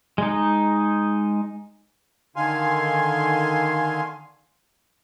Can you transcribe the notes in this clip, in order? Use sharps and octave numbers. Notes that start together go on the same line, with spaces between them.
G#3 D#4
D3 D#3 F5 G#5 C6